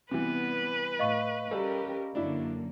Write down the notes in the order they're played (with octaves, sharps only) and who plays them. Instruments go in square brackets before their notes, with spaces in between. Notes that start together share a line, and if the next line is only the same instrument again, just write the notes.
[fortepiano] C3 E3 [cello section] G3 B3 [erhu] B4
[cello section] A2 [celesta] D#5 F5 C#6
[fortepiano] G3 A4 [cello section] C#4 G4 A#4
[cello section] F#2 D3 A#3 [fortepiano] D4 E4